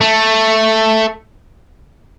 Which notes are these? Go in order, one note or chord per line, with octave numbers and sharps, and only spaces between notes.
A3